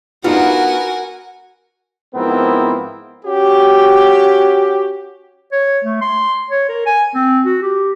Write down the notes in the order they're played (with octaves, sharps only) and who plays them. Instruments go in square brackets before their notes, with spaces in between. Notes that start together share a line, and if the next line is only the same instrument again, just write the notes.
[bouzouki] B3 [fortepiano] D4 D#4 F4 [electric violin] F#4 A#4 [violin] F#5 G#5
[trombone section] G#2 F3 B3 C4 E4 A#4
[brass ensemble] C#4 F#4 G4
[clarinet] C#5
A3
C6
C#5
A#4
G#5
C4
F#4
G4